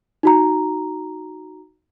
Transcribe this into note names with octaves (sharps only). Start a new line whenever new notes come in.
D#4 F#4 A#5